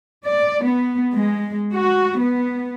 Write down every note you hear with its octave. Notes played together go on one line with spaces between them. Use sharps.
D5
B3
G#3
F#4
B3